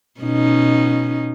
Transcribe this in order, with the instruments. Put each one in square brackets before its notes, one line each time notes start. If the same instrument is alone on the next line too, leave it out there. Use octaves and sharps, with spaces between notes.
[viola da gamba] B2 C#4 D#4